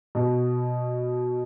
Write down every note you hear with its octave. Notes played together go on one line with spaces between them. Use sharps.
B2